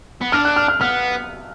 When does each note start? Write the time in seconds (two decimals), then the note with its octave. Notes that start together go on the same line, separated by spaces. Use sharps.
0.21 B3
0.32 D4 F6
0.45 F#6
0.56 F6
0.68 F6
0.81 B3 F6